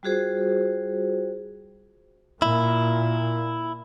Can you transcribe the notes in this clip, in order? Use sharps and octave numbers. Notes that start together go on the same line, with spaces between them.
G3 F4 F#4 G#4 C5
A#2 E4